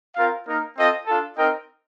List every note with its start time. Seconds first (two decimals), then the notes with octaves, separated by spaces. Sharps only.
0.16 C4 F4 A#4 F5
0.46 A#3 D#4 A#4
0.77 C4 F4 A4 D#5
1.07 D4 F4 A4
1.36 C4 D#4 A#4 D#5 G5